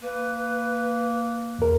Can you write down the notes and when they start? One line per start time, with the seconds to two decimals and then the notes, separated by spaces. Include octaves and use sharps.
0.02 A#3 B4
1.59 E2 A#4